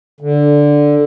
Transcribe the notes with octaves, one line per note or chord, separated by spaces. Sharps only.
D3